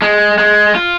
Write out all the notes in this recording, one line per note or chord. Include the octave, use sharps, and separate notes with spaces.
G#3
G#3
F4